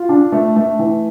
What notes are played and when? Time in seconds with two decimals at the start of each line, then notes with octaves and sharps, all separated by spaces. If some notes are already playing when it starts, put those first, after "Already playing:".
Already playing: F4
0.09 D4
0.32 A3
0.56 A3
0.79 E3